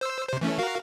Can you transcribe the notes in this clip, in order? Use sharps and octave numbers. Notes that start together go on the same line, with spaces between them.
C5 E6
C3 C5
E3 A3 C#4
F#4 A#4 F5